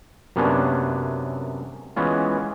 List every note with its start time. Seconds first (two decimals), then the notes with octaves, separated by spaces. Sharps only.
0.36 F#2 C3 A#3 B3 C#4 D4
1.96 E3 G#3 B3 C#4 F4